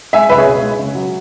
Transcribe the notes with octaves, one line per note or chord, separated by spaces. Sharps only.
G#3 E5 G#5
C#2 B4 E5
G#4 C#5
B2
G#3
C#3
F#3